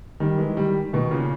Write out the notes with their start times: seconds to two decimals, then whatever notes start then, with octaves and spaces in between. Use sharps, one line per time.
0.20 D#3 G3
0.38 E3 G#3
0.57 D#3 G3
0.93 B2 D#3
1.11 A#2 C#3